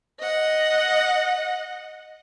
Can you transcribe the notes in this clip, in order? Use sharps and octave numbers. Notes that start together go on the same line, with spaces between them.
D#5 F#5